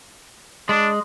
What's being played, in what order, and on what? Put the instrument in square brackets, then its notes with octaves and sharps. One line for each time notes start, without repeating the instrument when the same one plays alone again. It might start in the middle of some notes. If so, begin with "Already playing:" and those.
[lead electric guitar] G#3 [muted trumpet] D4